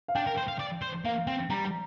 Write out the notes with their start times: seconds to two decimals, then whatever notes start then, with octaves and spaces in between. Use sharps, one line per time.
0.08 F5
0.15 D4 G5
0.27 A#4
0.37 C5
0.48 F5
0.59 D5
0.82 C5
1.05 A#3 F5
1.27 C4 G5
1.50 G3 A#5
1.65 A#5